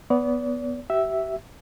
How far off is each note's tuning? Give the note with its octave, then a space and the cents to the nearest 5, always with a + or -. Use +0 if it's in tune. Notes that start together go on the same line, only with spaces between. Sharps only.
B3 +0 D5 -40
G4 -35 E5 +0